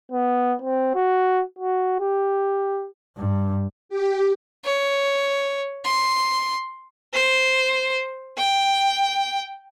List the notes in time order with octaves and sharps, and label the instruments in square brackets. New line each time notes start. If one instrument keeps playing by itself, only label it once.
[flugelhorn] B3
C4
F#4
F#4
G4
[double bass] G2
[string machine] G4
[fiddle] C#5
C6
[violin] C5
G5